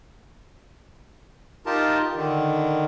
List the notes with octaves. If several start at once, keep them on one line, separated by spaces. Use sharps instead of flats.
D#4 F4 G4 A#4 A5
D3 D#3